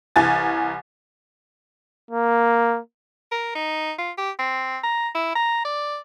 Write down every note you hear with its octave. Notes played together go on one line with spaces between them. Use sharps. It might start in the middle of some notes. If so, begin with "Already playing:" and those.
C2 E3 G#5 A6
A#3
A#4
D#4
F4
G4
C4
A#5
E4
A#5
D5